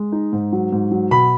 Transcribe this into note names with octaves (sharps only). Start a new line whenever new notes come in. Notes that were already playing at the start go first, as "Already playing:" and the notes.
Already playing: G#3
D#4
G#2
F#3
G#2
F#3
B2 B5